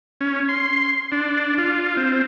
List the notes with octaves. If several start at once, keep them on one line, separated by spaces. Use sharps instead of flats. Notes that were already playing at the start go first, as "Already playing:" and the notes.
C#4
C6
D4
F4
C4